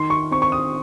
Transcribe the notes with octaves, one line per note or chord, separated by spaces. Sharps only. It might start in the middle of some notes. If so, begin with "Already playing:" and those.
Already playing: D#3 C6
C#6
C4 C#6
C#6
D#6